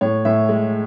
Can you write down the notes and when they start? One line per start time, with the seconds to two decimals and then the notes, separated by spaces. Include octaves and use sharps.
0.01 A2 C#5
0.25 A2 E5
0.49 G#3